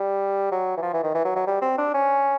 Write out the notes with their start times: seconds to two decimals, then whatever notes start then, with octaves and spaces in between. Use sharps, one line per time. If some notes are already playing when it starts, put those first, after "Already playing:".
Already playing: G3
0.51 F#3
0.77 E3
0.82 F3
0.93 E3
1.04 D#3
1.15 E3
1.25 F#3
1.35 F#3
1.47 G3
1.62 C4
1.78 D4
1.94 C#4